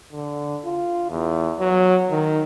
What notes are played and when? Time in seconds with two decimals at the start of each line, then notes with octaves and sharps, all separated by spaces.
0.12 D3
0.65 F4
1.10 E2
1.59 F#3
2.10 D#3